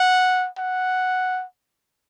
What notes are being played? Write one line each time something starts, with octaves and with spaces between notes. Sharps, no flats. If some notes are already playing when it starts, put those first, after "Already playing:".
Already playing: F#5
F#5